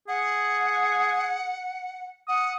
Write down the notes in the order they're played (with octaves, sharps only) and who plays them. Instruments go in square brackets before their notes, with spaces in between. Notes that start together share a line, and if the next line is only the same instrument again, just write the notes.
[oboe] G#4 [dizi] F#5
[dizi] F#5 [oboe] D#6